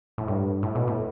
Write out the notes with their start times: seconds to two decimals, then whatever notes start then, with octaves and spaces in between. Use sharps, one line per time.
0.18 A2
0.28 G2
0.63 A2
0.75 B2
0.87 A2